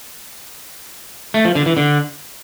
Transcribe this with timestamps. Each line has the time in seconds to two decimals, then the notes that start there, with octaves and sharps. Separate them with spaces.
1.34 A3
1.45 F3
1.55 D3
1.66 E3
1.77 D3